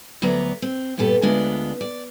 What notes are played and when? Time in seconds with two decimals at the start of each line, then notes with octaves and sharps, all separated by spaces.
0.22 D2 F#3 B3 D5 A#5
0.62 C4
0.97 G2 A#2 B3 G4 A4
1.22 D2 G#3 B3 D4 F4
1.81 D5